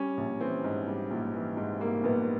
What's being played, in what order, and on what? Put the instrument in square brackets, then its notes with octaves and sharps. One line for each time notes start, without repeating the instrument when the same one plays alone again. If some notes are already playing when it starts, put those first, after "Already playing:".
Already playing: [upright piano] G3 C#4
A#1
E3 C4
G#2
G3
A#1
E3
G#2
G3 A#3
A#1 B3